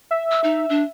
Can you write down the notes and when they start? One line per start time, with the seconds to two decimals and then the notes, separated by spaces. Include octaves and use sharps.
0.11 E5
0.31 E6
0.44 D#4
0.69 D4